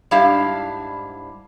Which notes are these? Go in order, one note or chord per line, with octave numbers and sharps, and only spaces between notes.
G#2 G3 D4 E4 G4 F5